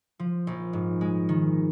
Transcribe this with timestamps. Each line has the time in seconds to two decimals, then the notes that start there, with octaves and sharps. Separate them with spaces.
0.19 F3
0.47 A#1
0.73 G#2
1.01 G#3
1.29 D#3